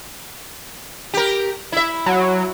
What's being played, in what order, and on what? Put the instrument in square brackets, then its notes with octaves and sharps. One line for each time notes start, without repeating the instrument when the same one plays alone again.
[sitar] G4 A#4
E4 E5
[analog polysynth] F#3